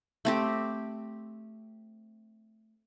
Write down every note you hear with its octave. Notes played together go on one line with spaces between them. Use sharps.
A3 C4 G4